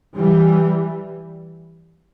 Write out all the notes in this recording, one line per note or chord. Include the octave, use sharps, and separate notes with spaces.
E3 G3